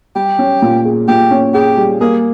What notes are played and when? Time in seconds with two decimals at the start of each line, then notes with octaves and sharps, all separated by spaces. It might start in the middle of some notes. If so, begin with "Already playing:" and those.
0.15 G3 G4
0.39 C#4
0.62 A#2
0.85 G#4
1.08 A#2 G4
1.31 C#4
1.54 G4 G#4
1.77 G3
2.01 A#3 G#4